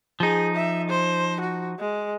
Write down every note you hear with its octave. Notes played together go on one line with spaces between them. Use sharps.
F3 D#4 G#4
E5
C5
F#4
G#3